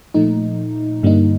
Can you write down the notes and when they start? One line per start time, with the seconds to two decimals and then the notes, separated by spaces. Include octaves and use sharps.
0.14 A#2 F3 A3 D#4
1.03 G2 D3 G3 A#3 D#4